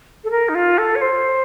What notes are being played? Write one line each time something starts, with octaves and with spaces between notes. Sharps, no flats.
A4
A#4
D#4
F4
A4
C#5
C5